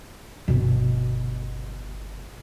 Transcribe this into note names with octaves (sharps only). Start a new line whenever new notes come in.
G1 B2